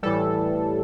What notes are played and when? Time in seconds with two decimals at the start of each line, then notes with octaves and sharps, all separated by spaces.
0.03 A2 E3 G3 A4